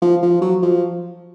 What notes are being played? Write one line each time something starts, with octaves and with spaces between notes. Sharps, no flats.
F3
F3
F#3
F3